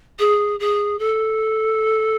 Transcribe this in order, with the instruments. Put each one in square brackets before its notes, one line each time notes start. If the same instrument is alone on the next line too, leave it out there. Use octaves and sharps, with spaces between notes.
[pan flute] G#4
G#4
A4